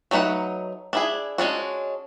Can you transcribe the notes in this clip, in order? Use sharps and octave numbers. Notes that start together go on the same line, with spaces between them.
F#3 A3 D#4 B4 F#5
D4 E4 G#4
G#3 C#4 D4 F#4